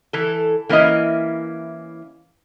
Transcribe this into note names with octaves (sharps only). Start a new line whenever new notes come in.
E3 A4
E3 A#3 C#4 E4 D#5